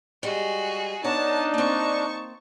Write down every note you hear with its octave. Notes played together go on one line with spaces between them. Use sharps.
G3 G#3 F#4 G#4
B3 D4 D#4 C#5 A5 A#5
A#3 C4 A5 C#6